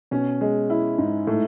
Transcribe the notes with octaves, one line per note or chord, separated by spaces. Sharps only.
B2 C#4
G#3
E4
G#2
A2 A3